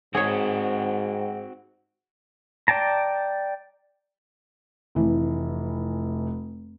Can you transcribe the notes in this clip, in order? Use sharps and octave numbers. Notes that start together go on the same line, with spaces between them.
G#2 C4 F#4 G#4 C#5
D5 G5 A5 A#5
F1 E3